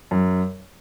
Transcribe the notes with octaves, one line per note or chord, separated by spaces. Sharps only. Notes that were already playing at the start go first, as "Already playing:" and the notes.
F#2